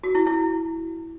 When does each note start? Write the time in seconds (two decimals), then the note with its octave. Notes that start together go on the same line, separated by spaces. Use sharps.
0.04 F#4
0.15 E4
0.27 E4